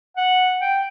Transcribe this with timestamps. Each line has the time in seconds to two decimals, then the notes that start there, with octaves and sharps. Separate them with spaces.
0.17 F#5
0.62 G5